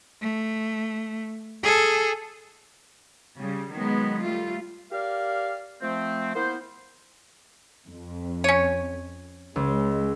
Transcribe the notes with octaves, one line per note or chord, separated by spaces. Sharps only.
A3
G#4 A4
C#3 G3
D#3 F#3 G#3 B3
G3 A3 F4
G4 A#4 D5 F5
F3 A3 C4
A#3 B3 E4 A#4 C5
F2
C#4 C#5 D#7
C#2 G#3